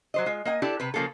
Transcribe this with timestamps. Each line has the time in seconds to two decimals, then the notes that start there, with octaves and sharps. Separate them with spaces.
0.14 F#3 C5 D#5
0.26 G#3 F4
0.45 A#3 D#5 F#5 G#5
0.62 D4 E4 G4 A4
0.80 C3 B4
0.94 C#3 F3 A#3 G#4 A4